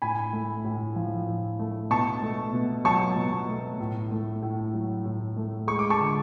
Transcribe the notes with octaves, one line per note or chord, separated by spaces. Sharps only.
A2 G#5 B5
A3
A2
F3
A2
A3
B2 A5 C#6
A3
B2
F#3 A5 C#6
B2
A3
A2
A3
A2
F#3
A2
A3
G#3 C#6
D6
A5 C#6
D3